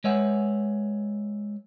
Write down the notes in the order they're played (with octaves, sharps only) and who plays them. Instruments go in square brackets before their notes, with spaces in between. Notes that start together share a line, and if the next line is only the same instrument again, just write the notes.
[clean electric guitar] G#3 B4 C#5 E5 F#5 G#5